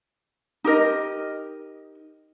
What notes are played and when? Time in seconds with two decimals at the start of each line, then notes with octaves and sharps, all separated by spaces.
0.64 D#4 G4 A#4 D#5